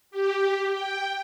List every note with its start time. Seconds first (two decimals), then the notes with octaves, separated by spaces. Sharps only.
0.11 G4
0.71 G5